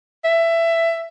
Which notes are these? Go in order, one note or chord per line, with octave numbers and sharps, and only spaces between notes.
E5